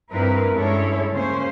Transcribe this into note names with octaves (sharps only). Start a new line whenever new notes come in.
G2 C4 E4 A#4 B4
G2 G#3 C#4 E4 A4 C#5
C#3 A#3 C#4 C5